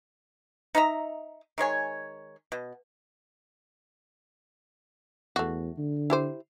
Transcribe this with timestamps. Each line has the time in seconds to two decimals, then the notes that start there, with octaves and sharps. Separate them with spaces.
0.75 D#4 D#5 E5 A#5
1.58 D#3 G#3 C#5 G#5
2.52 B2
5.36 E2 A3 F#4
5.78 D3
6.10 E4 G4 C5